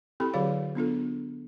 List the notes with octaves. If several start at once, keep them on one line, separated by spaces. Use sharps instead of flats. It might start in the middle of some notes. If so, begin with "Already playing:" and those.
C4 E4 G4 A4 B5
D3 F#3 F#4 G#4 C#5 F5
B3 D4 F4 A4